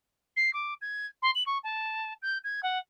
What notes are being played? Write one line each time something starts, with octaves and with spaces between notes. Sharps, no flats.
C7
D6
G#6
C6
F#7
C#6
A5
G6
G#6
F#5